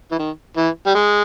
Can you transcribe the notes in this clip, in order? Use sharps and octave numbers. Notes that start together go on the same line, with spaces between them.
E3
D#3
E3
G3
G#3